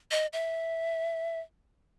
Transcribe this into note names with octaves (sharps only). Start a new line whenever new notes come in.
D#5
E5